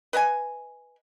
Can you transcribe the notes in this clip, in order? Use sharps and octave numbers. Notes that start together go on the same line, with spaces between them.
B4 D#5 F#5 G#5